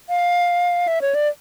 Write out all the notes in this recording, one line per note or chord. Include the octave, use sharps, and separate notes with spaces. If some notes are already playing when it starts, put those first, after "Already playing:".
F5
E5
C#5
D5